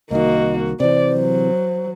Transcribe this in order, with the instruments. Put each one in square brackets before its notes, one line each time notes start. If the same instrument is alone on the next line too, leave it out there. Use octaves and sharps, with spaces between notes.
[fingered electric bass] C2 D#3 [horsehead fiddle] A#3 F#4 [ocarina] D#5
[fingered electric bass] C3 E3 [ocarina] C5 [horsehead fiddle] D5
[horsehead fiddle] F#3